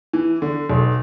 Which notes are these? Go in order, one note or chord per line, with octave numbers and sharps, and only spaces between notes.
E3
D3
B1